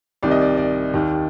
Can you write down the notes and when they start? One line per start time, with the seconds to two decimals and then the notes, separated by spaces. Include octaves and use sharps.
0.23 C2 C3 D#3 D5
0.31 D#5
0.42 D5
0.57 D5
0.94 D#2 D#3